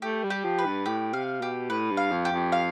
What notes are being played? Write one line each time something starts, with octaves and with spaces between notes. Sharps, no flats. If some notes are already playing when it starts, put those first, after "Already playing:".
A3 G4
G3
G4
F3
B4
G2
A2 G4
C3 F5
B2 G4
A2 B4
G2
F5
F2
G4
F2
F5